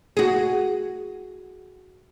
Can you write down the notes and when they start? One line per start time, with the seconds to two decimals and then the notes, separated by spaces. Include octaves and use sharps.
0.17 F#4 G#4